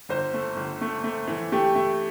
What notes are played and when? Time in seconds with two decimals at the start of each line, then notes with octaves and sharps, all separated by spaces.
0.09 G1 C5
0.34 A3
0.56 G1
0.81 A3
1.04 A3
1.27 E3
1.52 A3 G4
1.75 A3